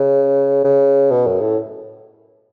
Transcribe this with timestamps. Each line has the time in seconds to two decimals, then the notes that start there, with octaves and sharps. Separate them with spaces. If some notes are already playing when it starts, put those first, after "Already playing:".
Already playing: C#3
0.65 C#3
1.11 B2
1.27 F#2
1.41 A2